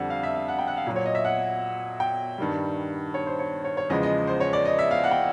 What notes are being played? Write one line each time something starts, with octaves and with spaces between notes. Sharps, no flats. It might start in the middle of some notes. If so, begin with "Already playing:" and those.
Already playing: F2 D3 G3 F#5
F5
E5
F5
F#5
G5
F#5
F5
A#2 F#3
C#5
D#5
E5
F#5
G5
G2 D#3 G3
C#5
C5
C#5
C#5
C#5
E2 C#3 F3 G#3 D#5
D#5
C5
C#5
D5
D#5
E5
F5
F#5
G5